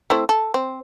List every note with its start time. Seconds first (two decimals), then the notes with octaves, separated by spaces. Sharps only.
0.10 A3 C4 E4
0.29 A4
0.54 C4